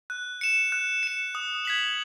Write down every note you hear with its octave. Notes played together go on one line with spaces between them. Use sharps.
F#6
C#7 E7
F#6
C#7 E7
D#6
G#6 B6 F#7